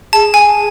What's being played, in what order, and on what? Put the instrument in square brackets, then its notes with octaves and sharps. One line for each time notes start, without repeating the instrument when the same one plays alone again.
[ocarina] G#4 [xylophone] A5
[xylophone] G#5